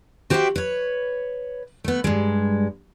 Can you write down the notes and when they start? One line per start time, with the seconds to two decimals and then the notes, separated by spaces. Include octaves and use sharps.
0.30 F#4 G4 C5 D5 E5 G5
0.56 B4 C#5
1.84 A3 B3
2.04 G2 G#3